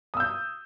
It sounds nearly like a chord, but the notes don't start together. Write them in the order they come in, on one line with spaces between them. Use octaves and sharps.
D#6 E6 G6